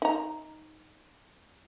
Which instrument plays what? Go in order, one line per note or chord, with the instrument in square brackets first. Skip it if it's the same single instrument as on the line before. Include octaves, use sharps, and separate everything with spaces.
[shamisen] D#4 A#5